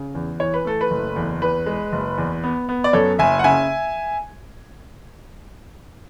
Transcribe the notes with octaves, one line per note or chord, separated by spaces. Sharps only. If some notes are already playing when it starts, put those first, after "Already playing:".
Already playing: C#3
E2
E3 C#5
B4
A3 A4
B4
F#1
E2
E2 B4
G#3
F#1
E2
B3
B3
D5
F#2 A4 C#5
F#1 E5 G#5
F#5
C#3 E5 G#5